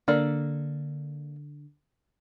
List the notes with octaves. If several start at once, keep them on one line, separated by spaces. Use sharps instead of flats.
D3 A#3 A4 D5